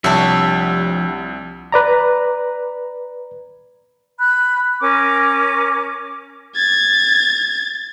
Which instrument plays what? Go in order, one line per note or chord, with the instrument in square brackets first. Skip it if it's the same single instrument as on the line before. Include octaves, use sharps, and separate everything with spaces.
[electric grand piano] C2 [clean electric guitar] F3 G4 C#5 [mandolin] D4 E5
[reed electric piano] B4 D5 A#5
[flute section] B5 F#6
C#4 A#4 D6
[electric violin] G#6 A6